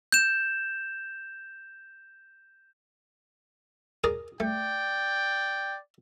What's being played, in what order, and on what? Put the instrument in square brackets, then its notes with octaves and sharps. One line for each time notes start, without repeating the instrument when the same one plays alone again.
[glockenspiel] G6 E7
[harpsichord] G#4 A#4 D5
[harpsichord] A3 [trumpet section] D5 G5